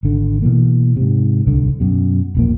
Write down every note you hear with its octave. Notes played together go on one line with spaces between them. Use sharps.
G#1 D3
B2 E3 A#3
G#2 C3
D1 C2 D3
F#2 B2
E1 A#1 A#3